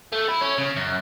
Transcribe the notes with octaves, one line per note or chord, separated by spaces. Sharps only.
A3
E4
C#4
C#3
F#2